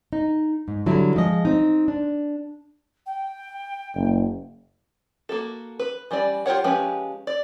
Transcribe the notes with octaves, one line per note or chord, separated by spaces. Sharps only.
D#4
G#2
D3 F#3 G3 E4
F3 G#3 D#5
C4 D#4
D4
G5
F#1
A#3 F#4 A4
B4
E3 G3 C#4 D5
F4 G4 A#4 C#5 F#5
F3 G#3 C#4 G4 B4
D5